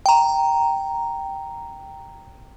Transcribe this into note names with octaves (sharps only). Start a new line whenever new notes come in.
G5 A#5